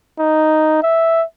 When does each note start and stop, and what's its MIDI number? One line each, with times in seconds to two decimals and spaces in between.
0.20 0.82 63
0.83 1.24 76